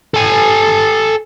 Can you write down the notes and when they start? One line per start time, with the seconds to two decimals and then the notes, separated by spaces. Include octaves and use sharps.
0.14 A4 G#5